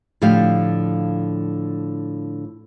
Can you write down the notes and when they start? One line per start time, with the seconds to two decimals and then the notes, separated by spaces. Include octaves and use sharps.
0.22 A2 D3 F3 G4 F5